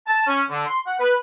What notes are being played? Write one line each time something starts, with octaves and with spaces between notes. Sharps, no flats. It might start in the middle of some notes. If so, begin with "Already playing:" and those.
A5
C#4
D3
C6
F#5
B4